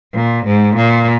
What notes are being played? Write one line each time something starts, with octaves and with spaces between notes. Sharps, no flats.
A#2
G#2
A#2